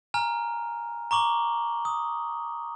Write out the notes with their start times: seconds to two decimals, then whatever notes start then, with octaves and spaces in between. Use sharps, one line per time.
0.14 G#5 A#5 F6
1.11 A#5 C#6 D6 F#7 G7
1.85 D#6